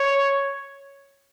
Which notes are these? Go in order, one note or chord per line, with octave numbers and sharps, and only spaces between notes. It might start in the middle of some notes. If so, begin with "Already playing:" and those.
Already playing: C#5